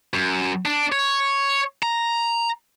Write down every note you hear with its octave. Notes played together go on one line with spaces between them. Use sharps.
F#2
D4
C#5
A#5